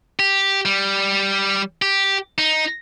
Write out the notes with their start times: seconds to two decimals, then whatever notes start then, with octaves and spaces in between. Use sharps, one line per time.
0.19 G4
0.65 G3
1.82 G4
2.38 D#4